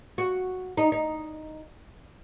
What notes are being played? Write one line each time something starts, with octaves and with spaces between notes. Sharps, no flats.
F#4
D#4
D#4